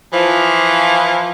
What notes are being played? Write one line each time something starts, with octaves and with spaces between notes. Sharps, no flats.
E3 F3